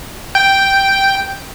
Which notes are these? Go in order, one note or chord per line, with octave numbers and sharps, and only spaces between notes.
G5